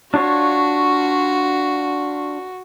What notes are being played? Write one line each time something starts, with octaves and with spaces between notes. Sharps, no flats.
D4 F4 F#4 C#5